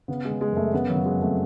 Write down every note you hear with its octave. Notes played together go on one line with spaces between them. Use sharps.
C#3 B3
G#3
C#3
G#3
F#2 A3
C#3 B3
F#3
C#3
G#3
F2 A3